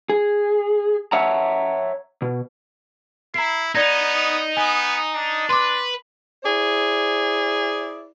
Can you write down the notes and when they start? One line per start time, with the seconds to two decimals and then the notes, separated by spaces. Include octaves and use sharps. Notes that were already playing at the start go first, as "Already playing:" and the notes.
0.09 G#4
1.12 C#5 E5 F#5 A5 A#5
2.22 B2
3.34 E4 A#5 C7
3.75 B3 D#4 D5 G#6 A#6
4.57 B3 G#5
5.13 D4
5.49 B4 C6 D6
6.44 E4 G#4 C5 D5